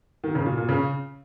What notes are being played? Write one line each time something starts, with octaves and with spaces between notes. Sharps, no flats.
D#3
C#3
A#2
A#2
C#3